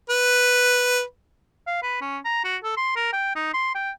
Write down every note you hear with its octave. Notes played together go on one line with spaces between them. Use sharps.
B4
F5
B4
C#4
A#5
F#4
A4
C6
A#4
G5
D#4
C6
G5